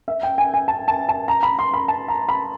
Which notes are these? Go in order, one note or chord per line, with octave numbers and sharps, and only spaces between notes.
E5
G5
G#5
G#5
A5
A5
A5
A#5
B5
C6
B5
A5
A#5
B5